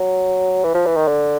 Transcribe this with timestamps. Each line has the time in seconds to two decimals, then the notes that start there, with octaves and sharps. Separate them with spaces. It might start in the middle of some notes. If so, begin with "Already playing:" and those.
Already playing: F#3
0.64 E3
0.74 F3
0.86 E3
0.97 D#3
1.07 D3